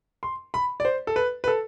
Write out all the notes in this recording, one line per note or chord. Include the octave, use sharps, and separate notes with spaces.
C6
B5
D5
C5
A4
B4
B4
A4